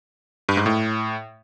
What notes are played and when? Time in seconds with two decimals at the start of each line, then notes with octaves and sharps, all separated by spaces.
0.49 G2
0.57 G#2
0.66 A2